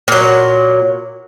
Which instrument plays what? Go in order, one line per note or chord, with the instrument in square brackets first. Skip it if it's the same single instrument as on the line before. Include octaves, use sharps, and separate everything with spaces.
[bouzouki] A#2 F#3